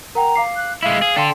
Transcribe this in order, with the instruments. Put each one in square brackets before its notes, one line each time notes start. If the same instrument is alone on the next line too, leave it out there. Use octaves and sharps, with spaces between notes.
[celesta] A#4 F#5 G5 [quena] A#5
[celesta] F5 D6 C7
[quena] F#6
[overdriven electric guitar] G#3 E4 [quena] F5 [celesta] E6
[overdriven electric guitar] G#4
[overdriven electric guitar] D4 A4 [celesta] G5 C6